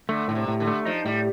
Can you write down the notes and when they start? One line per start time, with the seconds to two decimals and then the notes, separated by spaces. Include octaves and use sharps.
0.09 D3 A3
0.28 A2 D3
0.35 C3
0.48 A2
0.60 D3
0.67 A3
0.85 F3 D#4
1.05 A2 G3